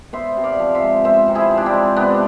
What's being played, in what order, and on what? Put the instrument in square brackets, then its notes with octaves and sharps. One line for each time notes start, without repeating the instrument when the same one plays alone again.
[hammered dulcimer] B3 C5 E5
C3
D5 F5
F3
C5 E5
G#3
B3 C5 E5
C3
E4 G#4
F3
D4
C4 E4
G#3
C3 B3 D4